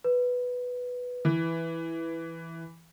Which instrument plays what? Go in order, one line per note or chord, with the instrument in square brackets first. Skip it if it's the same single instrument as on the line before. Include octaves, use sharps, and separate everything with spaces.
[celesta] B4
[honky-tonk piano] E3